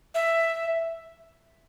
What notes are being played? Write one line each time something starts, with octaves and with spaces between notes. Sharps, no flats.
E5